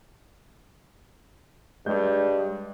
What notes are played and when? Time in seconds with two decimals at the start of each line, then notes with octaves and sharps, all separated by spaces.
1.86 G2 G#3 C#5 G6